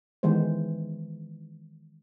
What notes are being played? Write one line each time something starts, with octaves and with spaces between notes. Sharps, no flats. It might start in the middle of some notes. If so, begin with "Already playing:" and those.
D#3 E3 G#3 B3 C5